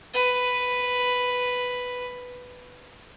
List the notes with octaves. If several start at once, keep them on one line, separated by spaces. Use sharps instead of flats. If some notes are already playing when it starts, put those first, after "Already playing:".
B4